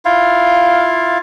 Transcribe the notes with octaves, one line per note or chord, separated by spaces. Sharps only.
E4 F4 F5